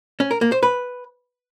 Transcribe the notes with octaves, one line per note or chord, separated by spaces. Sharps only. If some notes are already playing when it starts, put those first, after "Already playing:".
C#4
A#4
A#3
C5
B4